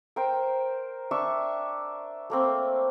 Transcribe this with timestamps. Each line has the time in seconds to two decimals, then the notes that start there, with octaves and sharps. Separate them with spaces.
0.16 A#4 C5 G5
1.11 D4 E5 C#6
2.30 A3 A#3 C4